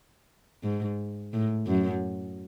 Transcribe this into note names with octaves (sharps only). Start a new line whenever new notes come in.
G#2
A2
F#2